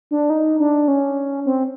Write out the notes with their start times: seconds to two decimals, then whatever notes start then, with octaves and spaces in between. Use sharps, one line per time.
0.11 D4
0.30 D#4
0.60 D4
0.88 C#4
1.46 C4